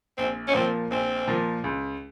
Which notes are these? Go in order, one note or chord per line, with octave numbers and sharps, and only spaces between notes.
A#1 C4
C#4
A#2 F3 A#3 C4
A#1 C4
A#2 F3 A#3
C#2